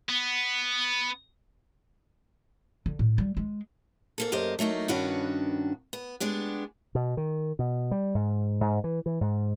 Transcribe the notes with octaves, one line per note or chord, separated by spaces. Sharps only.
B3
D3
A2
G3
G#3
G#2 A#3 A4
F#2 A#3 G4 C5 D#5
F#3 A3 A#3 D#4
G2 D#3 C#4 D4 F#4 B4
B3
G#3 B3 D4 G4
B2
D#3
B2
G3
G#2
G#2
E3
E3
G#2